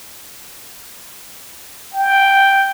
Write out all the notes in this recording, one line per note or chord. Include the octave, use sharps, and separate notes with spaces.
G5